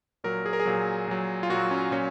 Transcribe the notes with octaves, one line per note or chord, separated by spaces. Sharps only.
A#2 F#3 A#4
G#4
A#4
G#4
A#2 F#3
A#2 F#3
F4
A#2 F#3 F#4
C#4
A#2 F#3 C#4